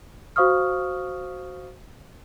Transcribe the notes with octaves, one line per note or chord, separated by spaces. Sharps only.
F#4 C5 F5 C#6 D#6 F6